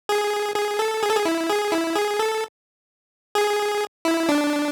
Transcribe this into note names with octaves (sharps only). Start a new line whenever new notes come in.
G#4
G#4
A4
G#4
A4
G#4
E4
G#4
E4
G#4
A4
G#4
E4
D4